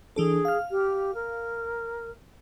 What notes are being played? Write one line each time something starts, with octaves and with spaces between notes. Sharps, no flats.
E3 D4 G#4 A4
F5 F6
G4
A#4